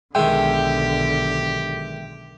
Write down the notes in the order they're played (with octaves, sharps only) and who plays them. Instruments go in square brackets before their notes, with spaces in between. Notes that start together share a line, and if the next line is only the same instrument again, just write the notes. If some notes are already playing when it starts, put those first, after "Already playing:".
[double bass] B1 D3 [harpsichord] D#3 G#3 [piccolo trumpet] G4 [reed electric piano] E5 G5